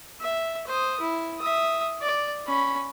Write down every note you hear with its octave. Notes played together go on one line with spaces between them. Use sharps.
E5
C5 D#6
E4
E5 D#6
D5
C#4 B5